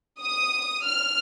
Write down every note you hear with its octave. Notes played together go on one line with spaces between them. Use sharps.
D#6
F6